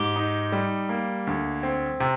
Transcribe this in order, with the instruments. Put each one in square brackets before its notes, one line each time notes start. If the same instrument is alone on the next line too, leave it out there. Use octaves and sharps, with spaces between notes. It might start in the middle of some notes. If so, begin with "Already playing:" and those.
Already playing: [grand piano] G#2 [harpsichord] G4
[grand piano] D#4
G3
A#3
D2
C4
C3